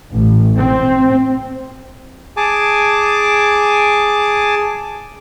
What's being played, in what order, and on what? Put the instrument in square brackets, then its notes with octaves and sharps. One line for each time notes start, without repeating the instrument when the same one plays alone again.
[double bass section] A1
C4
[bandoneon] G#4 G#5 A5 D6